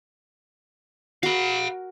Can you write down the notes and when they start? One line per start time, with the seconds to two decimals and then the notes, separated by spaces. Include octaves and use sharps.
1.23 F#4 A#4 F5 B5